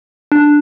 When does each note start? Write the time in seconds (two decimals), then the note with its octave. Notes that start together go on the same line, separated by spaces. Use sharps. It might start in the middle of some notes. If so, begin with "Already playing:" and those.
0.32 D4